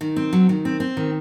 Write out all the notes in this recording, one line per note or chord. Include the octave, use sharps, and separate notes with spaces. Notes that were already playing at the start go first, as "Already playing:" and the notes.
D#3
C4
F#3
D#3
C4
C4
D#3